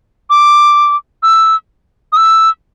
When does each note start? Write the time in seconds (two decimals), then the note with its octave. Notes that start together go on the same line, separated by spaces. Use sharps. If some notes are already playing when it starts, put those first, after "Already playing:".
0.30 D6
1.23 E6
2.13 D#6
2.17 E6